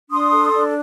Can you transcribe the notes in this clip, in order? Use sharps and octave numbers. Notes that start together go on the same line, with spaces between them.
D4 C6 D#6
A4
D4